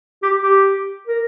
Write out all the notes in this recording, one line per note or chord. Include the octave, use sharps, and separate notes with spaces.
G4
G4
A#4